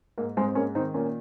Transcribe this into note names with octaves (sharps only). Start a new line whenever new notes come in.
G#2 A#3
G#2 G#3 C4
C4
G#3 A#3 C#4
D#3 C4 D#4
A#2 A#3 C#4